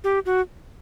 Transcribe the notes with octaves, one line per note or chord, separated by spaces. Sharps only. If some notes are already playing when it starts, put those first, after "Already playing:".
G4
F#4